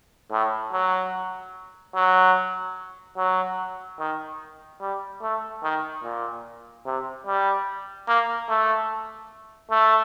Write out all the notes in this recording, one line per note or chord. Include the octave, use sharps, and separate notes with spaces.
A2
F#3
F#3
F#3
D#3
G3
A3
D#3
A#2
C3
G3
A#3
A3
A3